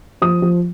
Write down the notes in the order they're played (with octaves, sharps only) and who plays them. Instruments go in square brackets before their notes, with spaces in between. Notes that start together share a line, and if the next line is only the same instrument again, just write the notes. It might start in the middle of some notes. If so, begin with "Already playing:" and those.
[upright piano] F3 D#6
F3